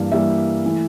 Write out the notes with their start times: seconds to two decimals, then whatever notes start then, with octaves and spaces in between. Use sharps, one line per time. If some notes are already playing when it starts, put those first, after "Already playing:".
Already playing: G2 E3 G3 A#3
0.12 G2 E3 G3 A#3 E5
0.66 E3 A3